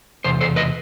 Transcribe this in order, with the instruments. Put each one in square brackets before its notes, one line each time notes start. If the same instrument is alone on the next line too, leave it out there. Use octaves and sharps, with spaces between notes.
[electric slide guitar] E2 C3 C5
A4 C5
B4 D#5